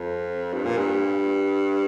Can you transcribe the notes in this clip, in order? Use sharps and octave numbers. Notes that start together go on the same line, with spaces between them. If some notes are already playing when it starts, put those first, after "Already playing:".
Already playing: F2
G2
A#2
G2